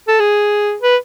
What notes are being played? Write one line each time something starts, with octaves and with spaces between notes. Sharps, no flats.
A4
G#4
B4